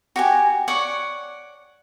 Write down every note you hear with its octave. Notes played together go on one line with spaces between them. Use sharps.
F#4 G4 G#5
C#5 D5 F#5 C#6